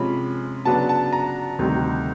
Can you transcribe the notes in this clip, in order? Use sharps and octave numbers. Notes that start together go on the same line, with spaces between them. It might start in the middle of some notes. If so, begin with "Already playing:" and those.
Already playing: C3 F3 G#3 C#4 B5
C#3 F#3 B3 D4 A5
A5
A#5
D2 C3 D#3 G3